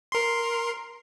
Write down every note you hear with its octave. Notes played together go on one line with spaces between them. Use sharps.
A#4 C6